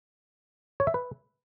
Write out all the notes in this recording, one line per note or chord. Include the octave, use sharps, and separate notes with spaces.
C#5
E5
B4